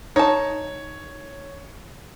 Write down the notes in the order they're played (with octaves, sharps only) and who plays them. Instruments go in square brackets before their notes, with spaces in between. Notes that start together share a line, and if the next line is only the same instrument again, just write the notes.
[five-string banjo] D#4 A5 [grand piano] C#5